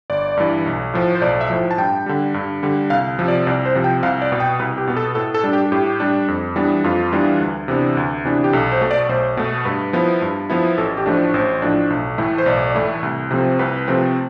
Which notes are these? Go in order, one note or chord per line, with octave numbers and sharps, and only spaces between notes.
G1 D5
G2 E3
B1
A2 F3
C5
B1 D5
E5
A2 F3
A5
G2 G5
D3 G3
G2
D3 G3
C2 F5
C3 F3
D5
C2 D5
C5
C3 F3
G5
C2 F5
D5
B2 B3
G5
C2 B4
G4
B2 B3
A4
A2 A4
A4
G3 D4
G4
A2 G4
G3 D4
F2
E3 G3 B3 D4
F2 F4
E3 G3 B3 D4
D2
C3 E3 B3 D4
D2
C3 E3 B3 D4
G4
B1 A4
C5
B2 A3
D5
B1 C5
B2 A3
G2 B4
F3 B3 E4
G2
F3 B3 E4
A1 A4
G4
A2 F3 A3 D4
A1 C5
A2 F3 A3 D4
B1
A2 E3 A3 E4
C5
B1 D5
A2 E3 A3 E4
C2
C3 F3 A3 C4
C2 B4
C3 F3 A3 C4